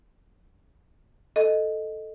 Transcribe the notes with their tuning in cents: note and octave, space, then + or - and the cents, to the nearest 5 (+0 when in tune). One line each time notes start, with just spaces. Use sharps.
A4 +0 D#5 +0